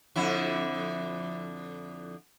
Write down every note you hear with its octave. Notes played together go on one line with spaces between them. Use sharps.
F2 D3 E4